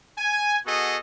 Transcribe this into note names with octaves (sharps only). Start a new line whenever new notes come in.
G#5
B3 F#4 G#4 A4 D#5